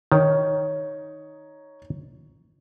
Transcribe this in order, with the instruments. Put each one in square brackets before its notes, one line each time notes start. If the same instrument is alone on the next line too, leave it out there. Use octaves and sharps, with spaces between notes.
[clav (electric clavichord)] D#3 [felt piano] D#4 C#5